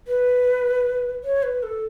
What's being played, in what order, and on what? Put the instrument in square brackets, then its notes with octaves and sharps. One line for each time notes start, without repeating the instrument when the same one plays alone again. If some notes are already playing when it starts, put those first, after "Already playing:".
[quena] B4
C#5
B4
A4